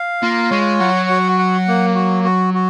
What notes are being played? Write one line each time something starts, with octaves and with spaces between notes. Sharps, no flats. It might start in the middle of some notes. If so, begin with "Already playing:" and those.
Already playing: F5
A#3 F4
G#3 C#5
F#3 F#5
F#4
F#5
A#3
F#4
F#4
F#4